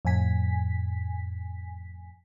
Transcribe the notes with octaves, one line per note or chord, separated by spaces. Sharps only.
F2 A2 G#5 B6